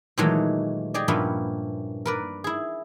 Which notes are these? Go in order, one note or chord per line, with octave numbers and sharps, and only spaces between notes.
A#2 D#3 E3 F#3 G#3 A3
G4 G#4 D5 D#5
G2 A#2 F3 B3 C#4 E4
A#4 B4 D5
E4 G#4